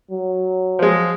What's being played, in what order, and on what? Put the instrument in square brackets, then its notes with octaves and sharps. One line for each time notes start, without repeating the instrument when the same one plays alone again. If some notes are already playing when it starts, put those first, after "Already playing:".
[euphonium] F#3
[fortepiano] F3 G#3